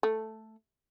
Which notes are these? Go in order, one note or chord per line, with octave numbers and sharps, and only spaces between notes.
A3